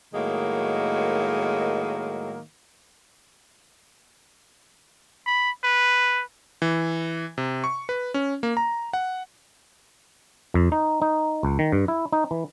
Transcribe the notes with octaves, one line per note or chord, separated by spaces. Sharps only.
A2 D#3 F#3 G#3 A#3
B5
B4
E3
C3
C#6
B4
C#4
A#3
A#5
F#5
F2
D#4
D#4
C#2
D#3
G2
E4
D#4
E3